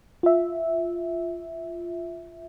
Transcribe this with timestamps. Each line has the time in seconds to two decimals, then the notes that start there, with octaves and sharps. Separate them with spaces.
0.23 F4 E5